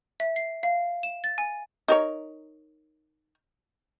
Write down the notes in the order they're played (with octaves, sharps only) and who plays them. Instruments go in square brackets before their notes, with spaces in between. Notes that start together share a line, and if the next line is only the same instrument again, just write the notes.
[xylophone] E5
C7
F5
E7
A6
G#5
[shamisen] D#4 A#4 C#5